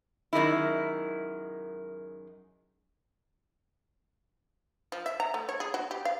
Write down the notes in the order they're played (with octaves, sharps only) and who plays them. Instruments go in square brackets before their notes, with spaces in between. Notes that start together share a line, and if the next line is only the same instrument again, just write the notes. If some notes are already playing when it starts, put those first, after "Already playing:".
[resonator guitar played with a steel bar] F#2 D#3 G#3 E4
[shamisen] F3
E5
A#5
A3
C#5
G#4
F#4
G4
F5